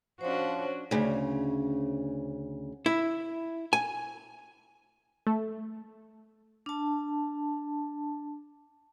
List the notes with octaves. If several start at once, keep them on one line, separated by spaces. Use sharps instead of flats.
F3 C#4 D4 F#4 C5 C#5
D2 C#3
E4
G#5
A3
D4 A5